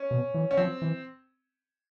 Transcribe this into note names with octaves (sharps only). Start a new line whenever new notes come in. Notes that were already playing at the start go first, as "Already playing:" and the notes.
Already playing: C#4
B2
E3
C#4
F3 C4
E3